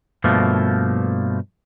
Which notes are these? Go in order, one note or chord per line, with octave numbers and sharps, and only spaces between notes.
G2 B2 F3 A3 A#3